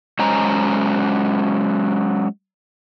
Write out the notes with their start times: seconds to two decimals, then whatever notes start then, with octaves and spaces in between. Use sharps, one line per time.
0.19 F#3 G#3 C#4 C5 A#5